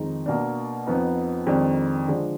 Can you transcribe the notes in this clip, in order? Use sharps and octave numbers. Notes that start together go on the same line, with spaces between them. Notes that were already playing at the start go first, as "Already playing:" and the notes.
Already playing: F2 D#3 G#3 D#4
B2 A#3 D4
F2 F3 B3 D#4
F2 D#3 G#3 D4
D3 F3 G#3 D4